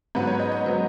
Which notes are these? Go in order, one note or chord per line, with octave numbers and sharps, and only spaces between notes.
G#2 F#3 B3 B4
C#5
D#5
D#5
F#3 B3